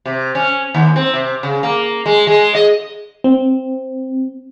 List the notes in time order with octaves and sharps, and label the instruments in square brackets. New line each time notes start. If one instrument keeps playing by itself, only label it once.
[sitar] C3
C#4
D#2
C4
C3
C#3
A#3
G#3
G#3
D#5
[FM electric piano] C4